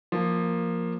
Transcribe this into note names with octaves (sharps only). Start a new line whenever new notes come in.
F3 A#3